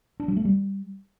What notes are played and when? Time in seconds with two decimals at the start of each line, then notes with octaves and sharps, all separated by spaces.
0.20 D4
0.28 F#3
0.37 A3
0.45 G3